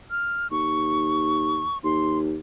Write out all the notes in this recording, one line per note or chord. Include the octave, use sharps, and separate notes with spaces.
F6
D#2 C#6
D#2 C6